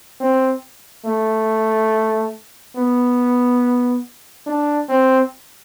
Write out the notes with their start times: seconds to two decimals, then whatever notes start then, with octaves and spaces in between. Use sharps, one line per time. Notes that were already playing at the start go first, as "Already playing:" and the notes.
0.20 C4
1.05 A3
2.75 B3
4.47 D4
4.89 C4